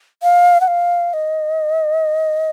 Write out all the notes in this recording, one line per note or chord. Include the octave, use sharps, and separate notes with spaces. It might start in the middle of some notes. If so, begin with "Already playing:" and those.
F5
F#5
F5
D#5